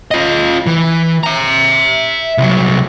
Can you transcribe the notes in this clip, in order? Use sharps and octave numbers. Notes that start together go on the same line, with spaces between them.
F4 D#5
E3
E5 A#5
C2 F#3